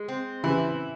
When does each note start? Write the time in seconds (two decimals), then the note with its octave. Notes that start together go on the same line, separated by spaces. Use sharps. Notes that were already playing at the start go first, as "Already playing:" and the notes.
Already playing: G#3
0.09 C4
0.44 E3 E4